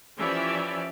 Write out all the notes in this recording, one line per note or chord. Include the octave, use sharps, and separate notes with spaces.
E3 F3 C#4 G4 D5 E5